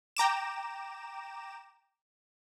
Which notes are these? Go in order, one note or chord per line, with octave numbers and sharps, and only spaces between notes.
G5 A#5 D6 E7